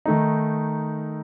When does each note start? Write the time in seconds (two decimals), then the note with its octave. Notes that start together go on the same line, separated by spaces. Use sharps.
0.06 D#3 A3 D#4